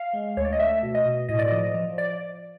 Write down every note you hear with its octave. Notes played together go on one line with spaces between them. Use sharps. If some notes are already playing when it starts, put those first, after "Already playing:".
Already playing: F5
G#3
D2 C#5
D5
D#5
A3 E5
B2
D#5
B2
A2 D#5
D5
F3 D#5
F3
D5